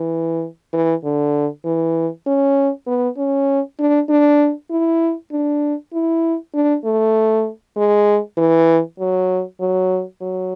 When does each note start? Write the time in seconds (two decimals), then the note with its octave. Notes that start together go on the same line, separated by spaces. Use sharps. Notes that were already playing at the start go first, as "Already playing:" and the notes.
Already playing: E3
0.73 E3
1.04 D3
1.65 E3
2.27 C#4
2.87 B3
3.18 C#4
3.79 D4
4.09 D4
4.71 E4
5.32 D4
5.93 E4
6.54 D4
6.85 A3
7.77 G#3
8.37 E3
8.99 F#3
9.60 F#3
10.21 F#3